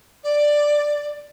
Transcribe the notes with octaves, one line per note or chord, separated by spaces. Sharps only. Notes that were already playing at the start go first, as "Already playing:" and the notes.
D5